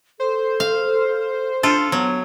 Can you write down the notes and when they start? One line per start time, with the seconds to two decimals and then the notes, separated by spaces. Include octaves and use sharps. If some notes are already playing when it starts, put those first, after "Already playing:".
0.20 A4 C5
0.60 F5
1.63 D4 F4 A4
1.92 F#3 B3